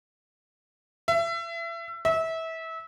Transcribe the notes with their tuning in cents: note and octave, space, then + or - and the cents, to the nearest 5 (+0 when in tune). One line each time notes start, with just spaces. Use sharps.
E5 +30
E5 -25